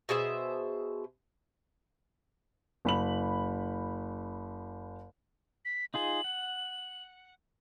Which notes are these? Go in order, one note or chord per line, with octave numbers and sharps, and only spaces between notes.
B2 G#4 C5 E5
F#1 B5 F#7
B6
D#4 F4 G#4 F#7
F#5